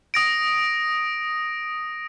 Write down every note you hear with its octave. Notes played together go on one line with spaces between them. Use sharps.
D#6 A#6 D7